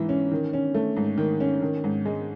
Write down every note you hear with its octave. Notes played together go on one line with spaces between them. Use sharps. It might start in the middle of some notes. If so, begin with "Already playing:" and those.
Already playing: G#2 E3
C#4
D#3
C#4
A3
G#2
D#3
C#4
D#3
G#2
G#3